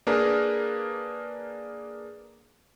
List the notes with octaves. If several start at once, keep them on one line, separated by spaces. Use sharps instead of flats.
A#3 D4 G#4 A#4 B4